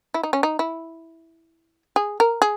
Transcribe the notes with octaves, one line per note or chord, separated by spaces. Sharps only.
E4
D#4
C#4
D#4
E4
G#4
A#4
G#4